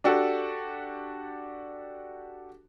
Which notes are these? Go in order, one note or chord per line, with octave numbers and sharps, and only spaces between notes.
D4 F#4 G4 A4